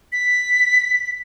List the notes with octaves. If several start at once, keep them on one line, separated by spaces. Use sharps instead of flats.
B6